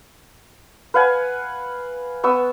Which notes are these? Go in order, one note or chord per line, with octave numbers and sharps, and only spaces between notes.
B4 F5 F#5 G#5
B3 C#6 E6